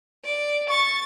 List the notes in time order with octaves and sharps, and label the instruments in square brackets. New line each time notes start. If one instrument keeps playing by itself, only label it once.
[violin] D5
[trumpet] C#6 [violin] A6